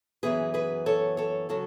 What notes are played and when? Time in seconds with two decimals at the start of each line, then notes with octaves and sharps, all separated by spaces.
0.23 F#2 E3 B3 G#4 B4
0.54 G#4 B4
0.86 A4 C#5
1.17 A4 C#5
1.49 C#3 F#3 F#4 A4